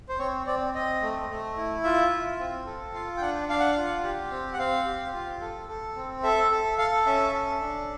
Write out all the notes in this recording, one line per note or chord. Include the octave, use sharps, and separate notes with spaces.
C5
C4 C#5
C4 D5
C4 D#5
A3
A3
E4
F4 E5
F4
C4
A4
F4 F5
G5
D4 F#5
D4 F5
F#5
F4 F5
G4
C4
F#5
C4 F5
G4
F4
A4
A4
C4
A4 E5
A4
A4 F5
C#4 E5
A4
D4